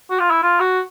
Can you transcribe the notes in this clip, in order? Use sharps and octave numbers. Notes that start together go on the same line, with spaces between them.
F#4
F4
E4
F4
F#4